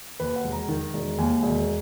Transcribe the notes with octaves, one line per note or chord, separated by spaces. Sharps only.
D#2 B4
F#5
E1
A#5
D#3
E1
D#2 G#5
E1